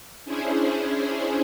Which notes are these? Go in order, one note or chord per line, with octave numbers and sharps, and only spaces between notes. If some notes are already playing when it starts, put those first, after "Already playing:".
C#4 D4 E4 G#4 C5